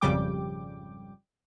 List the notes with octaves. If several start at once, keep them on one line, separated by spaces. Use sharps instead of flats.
G#1 F2 C#3 G3 G5 D6